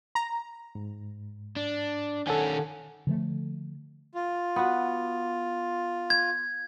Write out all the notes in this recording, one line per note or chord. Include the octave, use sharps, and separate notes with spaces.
A#5
G#2
D4
D#3 C#4 A4 F#5 G#5
D3 F3 A3
F4
B3 F#4
G#6